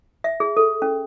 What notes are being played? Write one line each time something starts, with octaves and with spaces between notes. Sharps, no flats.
E5
G#4
A4
C#4